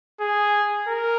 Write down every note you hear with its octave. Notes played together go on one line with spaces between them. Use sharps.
G#4
A#4